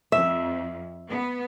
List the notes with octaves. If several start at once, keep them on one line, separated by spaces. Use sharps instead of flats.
F2 E5
B3